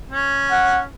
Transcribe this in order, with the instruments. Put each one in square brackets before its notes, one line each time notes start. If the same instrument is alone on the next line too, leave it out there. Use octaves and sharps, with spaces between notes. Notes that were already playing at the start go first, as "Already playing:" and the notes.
[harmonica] C#4
[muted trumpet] F#5